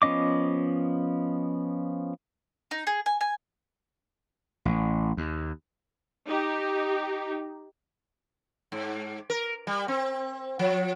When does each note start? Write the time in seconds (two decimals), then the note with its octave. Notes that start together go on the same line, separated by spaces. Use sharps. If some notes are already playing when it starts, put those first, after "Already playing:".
0.02 F3 B3 C#4 D#5 D6
2.71 D#4
2.87 G#4
3.06 G#5
3.21 G#5
4.65 A1
5.17 D#2
6.26 D#4 G4
8.72 G#2
9.30 A#4
9.67 G3
9.88 C4
10.59 F3